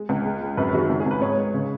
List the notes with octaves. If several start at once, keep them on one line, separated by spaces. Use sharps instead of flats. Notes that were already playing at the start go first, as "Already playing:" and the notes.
Already playing: G#3
C#2
G#3
G#3
F#2 B4
B4
D#3 F#4
G#4
C#2 G#4
G#4
C#2 B4
G#2 C#5
G#3
C#3